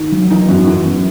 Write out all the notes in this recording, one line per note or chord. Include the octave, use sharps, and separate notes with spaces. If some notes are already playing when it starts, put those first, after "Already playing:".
Already playing: D#3
F#3
E3 D#4
F#2 F#4
E3
F#2